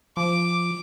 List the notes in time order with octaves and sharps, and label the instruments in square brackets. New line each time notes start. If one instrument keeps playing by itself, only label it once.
[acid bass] F3 [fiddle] D6